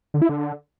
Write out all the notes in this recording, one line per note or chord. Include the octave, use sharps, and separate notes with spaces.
D3
E4
D3